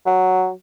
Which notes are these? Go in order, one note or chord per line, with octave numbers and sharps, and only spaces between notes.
F#3